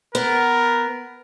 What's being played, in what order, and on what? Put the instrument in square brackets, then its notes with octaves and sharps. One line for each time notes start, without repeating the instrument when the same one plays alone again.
[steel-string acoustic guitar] B3 [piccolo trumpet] A#4